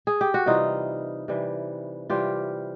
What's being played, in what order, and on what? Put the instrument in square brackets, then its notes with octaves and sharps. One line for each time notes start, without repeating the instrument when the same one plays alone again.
[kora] G#4
G4
F#4
C3 E3 G3 D#4 F4
C3 E3 G3
C3 E3 G3 F4 G4